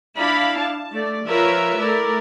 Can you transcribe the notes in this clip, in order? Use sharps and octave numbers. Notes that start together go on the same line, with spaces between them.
D4 E4 F5 B5
A5
A3 D5
F3 F4 A#4 B4 C#5 E5
A3 E4 A#4 D5